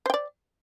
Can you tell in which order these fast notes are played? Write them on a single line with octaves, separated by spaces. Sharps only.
C5 G5 D5